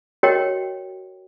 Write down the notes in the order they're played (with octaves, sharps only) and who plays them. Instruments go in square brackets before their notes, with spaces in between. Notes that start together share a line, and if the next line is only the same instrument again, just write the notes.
[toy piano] F#4 A#4 C#5 D#5 G5